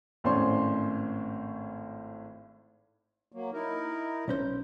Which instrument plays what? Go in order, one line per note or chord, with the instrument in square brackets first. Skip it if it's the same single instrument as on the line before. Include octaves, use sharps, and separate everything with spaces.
[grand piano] G#1 A2 C#4 C5 D5 C6
[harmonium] F#3 A#3
D#4 E4 A#4
[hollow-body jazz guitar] B1 C#4 C5